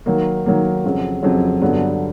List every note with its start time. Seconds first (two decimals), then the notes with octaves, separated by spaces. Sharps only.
0.06 D#3 F#3 A#3
0.46 D#3 F#3 A#3
0.84 F2 C#3 F#3
1.23 F2 C#3 F#3
1.62 G2 D3 F#3 B3 D4